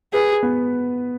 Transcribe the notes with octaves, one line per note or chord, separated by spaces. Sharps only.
G#4 B4
B3